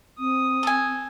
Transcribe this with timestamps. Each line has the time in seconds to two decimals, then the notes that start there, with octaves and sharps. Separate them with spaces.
0.19 C4 D#6
0.63 A4 G#5